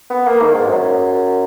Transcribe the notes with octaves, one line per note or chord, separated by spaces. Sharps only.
B3
A#3
D#3
G#2
F#2